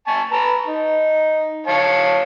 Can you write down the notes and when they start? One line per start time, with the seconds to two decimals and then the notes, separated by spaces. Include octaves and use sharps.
0.07 G#5 A5 C#6
0.32 B4 A5 A#5
0.67 D#4
1.67 C#5 F5 A5